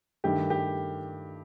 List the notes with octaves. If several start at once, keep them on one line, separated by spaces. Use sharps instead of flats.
G2 D#3 A3 G4
G4